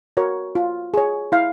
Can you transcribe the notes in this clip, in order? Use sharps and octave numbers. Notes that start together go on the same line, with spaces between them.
F#4 A#4 C#5
F4
G#4 C#5
E4 F5